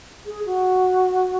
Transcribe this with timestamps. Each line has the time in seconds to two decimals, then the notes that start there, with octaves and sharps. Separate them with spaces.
0.26 G#4
0.46 F#4